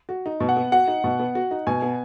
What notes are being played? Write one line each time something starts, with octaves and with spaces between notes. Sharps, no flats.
F#4
D#4
B2
F#5
B3
F#4 F#5
D#4
B2
B3
F#4
D#4
B2 G#5
B3